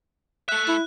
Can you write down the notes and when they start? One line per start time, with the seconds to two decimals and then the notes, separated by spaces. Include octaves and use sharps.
0.49 A3 E5 F#6
0.68 E4